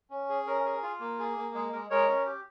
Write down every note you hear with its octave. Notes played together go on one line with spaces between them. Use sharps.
C#4
G#4
C#4 A#4
G#4
F4
A#3
G#4
A#3
G#3 G#4
G#3 A#4
G#3 A#4 C#5
C#4
G4